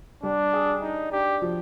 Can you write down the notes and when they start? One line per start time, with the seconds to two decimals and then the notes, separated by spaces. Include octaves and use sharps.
0.23 G3 D4
0.53 G#4
0.82 D4 D#4
1.12 D4 G4
1.42 F3